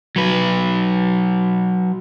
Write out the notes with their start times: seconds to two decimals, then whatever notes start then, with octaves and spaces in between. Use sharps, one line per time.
0.16 F#3 B4